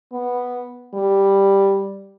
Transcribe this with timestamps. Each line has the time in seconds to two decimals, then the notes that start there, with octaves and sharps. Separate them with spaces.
0.12 B3
0.94 G3